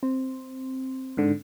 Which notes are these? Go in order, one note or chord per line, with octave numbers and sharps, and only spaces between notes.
C4
G#2 D3